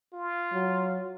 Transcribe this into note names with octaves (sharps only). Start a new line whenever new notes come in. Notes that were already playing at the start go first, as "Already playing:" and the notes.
F4
F#3